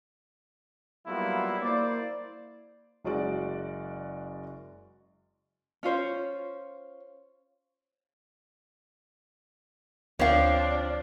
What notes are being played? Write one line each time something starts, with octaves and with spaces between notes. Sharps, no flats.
F#3 G3 A#3 B3 E4 F4
A#3 E4 C5 D5
F#1 G#3 C#4 F#4 D5
C#4 F4 C5 C#5
D2 F3 C4 D4 C#5 F5